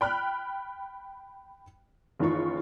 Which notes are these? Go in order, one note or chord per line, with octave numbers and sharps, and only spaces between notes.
G5 B5 F6 F#6
F#1 D#3 E3 F4 C#6